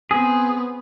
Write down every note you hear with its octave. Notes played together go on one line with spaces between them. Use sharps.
B3 C4 G#4